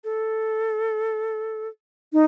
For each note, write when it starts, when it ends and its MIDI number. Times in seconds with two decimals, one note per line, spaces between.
0.04 1.68 69
2.13 2.25 63